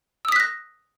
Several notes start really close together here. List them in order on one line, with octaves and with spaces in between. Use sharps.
E6 D#6 B6 F#6 A#6